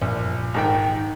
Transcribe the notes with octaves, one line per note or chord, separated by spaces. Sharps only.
A#1
G#2 D#3 G5